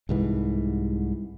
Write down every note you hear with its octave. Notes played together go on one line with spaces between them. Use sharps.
C2 G#2 E3